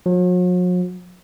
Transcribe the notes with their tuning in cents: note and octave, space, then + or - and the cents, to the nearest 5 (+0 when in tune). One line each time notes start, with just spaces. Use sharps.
F#3 -45